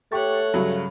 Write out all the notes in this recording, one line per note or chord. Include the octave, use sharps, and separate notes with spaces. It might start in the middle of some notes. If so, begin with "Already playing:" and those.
A3 G4 C#5 F#5 C#6 A6
G2 C#3 F#3